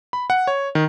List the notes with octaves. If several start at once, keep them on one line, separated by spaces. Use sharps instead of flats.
B5
F#5
C#5
D#3